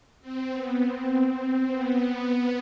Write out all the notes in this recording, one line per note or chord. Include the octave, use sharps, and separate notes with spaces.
C4
B3
C4
C4
B3